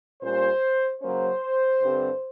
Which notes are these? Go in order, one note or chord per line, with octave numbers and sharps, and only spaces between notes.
A#2 G3 A#3 C#4 C5
C#3 F#3 A#3 C#4 C5
G2 D3 G3 C4